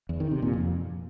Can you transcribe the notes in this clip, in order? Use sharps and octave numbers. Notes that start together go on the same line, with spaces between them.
E2
D#3
C3
A#2
F2